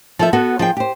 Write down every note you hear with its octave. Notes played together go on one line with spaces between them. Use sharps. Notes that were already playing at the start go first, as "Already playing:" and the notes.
F3 A4 E5
B3 F#4 A4
F3 G#4 G5
G4 C5